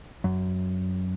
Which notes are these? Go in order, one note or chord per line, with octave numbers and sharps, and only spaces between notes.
F#2